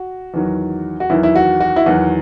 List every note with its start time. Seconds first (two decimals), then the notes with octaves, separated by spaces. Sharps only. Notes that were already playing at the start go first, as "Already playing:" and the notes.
Already playing: F#4
0.34 E2 D#3 F#3
1.00 F#4
1.10 E2 D#3 F#3 E4
1.23 E4
1.35 F#4
1.60 F#4
1.76 E4
1.86 E2 D#3 F#3 F#4